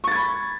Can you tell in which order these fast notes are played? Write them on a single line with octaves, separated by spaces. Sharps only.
C#6 A6 G#6 B5